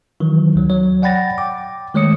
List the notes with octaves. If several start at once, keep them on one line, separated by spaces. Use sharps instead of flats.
D#3 E3 F#3
D2 F#3
F#3 C#5
D5 F#5 G5 B5 A6 A#6
G5 D6
D#3 G#3 A3 C#5 D#6 C#7